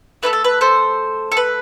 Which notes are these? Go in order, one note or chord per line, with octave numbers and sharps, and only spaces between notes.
A3 D4 A4 B4
A4
B4
A4 C5
A4
B4